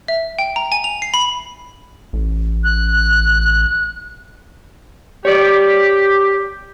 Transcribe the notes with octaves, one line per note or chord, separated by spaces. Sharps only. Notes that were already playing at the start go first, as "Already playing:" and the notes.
E5
G5
A#5
G#5
F7
C7
B5
A1
F#6
G4 C#5 D5